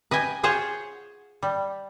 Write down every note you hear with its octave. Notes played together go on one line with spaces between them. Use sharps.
B4 D#5 G5 G#5
F4 G#4 C5 C#5 F#5
G3